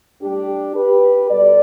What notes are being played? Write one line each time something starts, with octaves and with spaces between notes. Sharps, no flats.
A2 G3 D4 G4
G4 B4
B2 G3 A4 D5